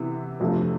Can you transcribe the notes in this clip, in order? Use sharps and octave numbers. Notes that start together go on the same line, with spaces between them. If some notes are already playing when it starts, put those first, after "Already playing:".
Already playing: C3 E3 B3
G1 F2 C3 F3 A3